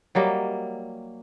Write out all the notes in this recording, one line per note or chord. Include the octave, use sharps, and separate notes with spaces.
F#3 G3 A#3 D#5